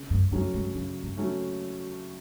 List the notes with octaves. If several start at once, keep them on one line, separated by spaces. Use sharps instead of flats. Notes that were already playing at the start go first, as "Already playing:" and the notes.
Already playing: C#3
F#2
F#2 F#3 A3 C#4
G2
F#2 C#3
G2
F#3 A3 C#4